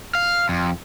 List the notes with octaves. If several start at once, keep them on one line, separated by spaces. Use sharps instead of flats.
F5
F2